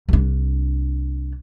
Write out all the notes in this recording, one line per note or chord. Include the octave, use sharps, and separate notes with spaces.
C2 D4